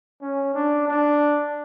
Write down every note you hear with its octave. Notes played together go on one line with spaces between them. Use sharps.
C#4
D4
D4